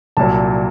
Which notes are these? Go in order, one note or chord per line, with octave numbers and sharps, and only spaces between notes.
C2 A#2 F#3 A5